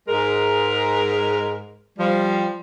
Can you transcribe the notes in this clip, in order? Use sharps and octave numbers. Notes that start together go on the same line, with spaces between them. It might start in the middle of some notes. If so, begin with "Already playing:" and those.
G#2 G#3 A#4
F3 G3